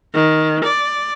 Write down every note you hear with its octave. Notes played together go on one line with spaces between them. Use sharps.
D#3
D5